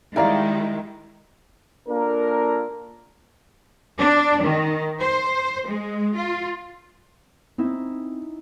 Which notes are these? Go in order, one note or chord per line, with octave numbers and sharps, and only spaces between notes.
D#3 G3 G#3 E4 A#4 D5 F5 A#5
A#3 D4 F4 A4 A#4
D4
D#3
C5
G#3
F4
C4 C#4 D#4 E4